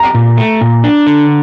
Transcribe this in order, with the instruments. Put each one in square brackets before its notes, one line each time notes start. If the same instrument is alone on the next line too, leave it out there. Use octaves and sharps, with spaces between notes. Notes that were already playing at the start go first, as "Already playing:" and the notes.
Already playing: [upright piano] A#5
[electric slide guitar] A#2
A3
A#2
D4
D3